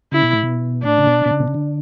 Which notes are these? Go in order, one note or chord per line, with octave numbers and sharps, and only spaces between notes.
C#3 E4
B2
A2
B2
A2 D4
C#3
B2
B2
C#3
B2
C#3
D3